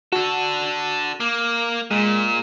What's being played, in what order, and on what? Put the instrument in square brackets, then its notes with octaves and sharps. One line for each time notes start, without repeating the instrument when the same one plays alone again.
[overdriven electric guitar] D4 A4 [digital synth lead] F#4
[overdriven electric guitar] A#3 [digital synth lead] D6
[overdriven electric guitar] A#2 [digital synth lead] G#3